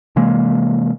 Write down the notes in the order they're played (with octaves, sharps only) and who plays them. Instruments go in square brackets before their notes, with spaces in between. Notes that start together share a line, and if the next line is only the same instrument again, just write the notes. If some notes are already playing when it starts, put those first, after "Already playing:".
[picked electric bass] C3 E3 G#3 A#3